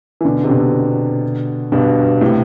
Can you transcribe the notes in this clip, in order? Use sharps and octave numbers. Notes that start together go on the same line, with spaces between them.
E3
B2 D3
C3
B2 D3
G2 B2
A2 C3